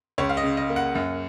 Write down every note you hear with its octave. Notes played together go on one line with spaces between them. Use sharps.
C#2 C#5
F5
D#5
C#3
D#5
A#3
F#5
F#2